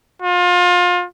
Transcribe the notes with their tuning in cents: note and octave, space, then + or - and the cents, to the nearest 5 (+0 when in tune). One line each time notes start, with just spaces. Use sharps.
F4 +30